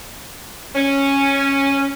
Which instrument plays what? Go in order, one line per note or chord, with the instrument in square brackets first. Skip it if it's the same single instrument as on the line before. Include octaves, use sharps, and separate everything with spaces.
[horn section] C#4